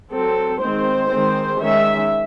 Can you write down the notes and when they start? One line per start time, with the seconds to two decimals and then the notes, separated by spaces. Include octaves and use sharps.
0.12 F#3 C4 A4
0.60 D#3 G#3 C4 C5
1.10 D#3 G#3 C4
1.59 D#3 G#3 C#4 E5